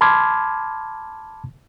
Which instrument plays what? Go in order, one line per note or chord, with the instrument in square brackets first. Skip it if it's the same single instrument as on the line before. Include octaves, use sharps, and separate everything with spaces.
[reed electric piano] A5 B5 C6 D6 F6 G#6